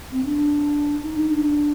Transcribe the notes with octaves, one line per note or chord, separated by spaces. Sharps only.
C4
D4
D#4
D#4
D4